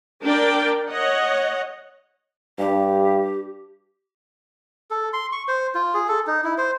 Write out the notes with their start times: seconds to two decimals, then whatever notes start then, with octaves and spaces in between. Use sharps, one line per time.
0.23 D4 A#4 D5 G5
0.90 C#5 D#5 F#5
2.59 G2 G4
4.91 A4
5.13 C6
5.32 C#6
5.48 C5
5.75 F4
5.94 G#4
6.09 A4
6.27 D#4
6.44 E4
6.58 C5